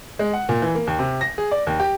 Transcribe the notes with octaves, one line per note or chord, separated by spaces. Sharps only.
G#3
F#5
A#2
E3
A#3
D#2
C3
A#6
G#4
D5
D#2
G4